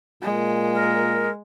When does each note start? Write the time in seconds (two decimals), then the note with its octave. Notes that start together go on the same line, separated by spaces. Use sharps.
0.23 A#2 G#3
0.74 A#4